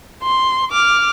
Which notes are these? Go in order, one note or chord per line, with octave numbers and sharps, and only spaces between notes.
C6
D6 F6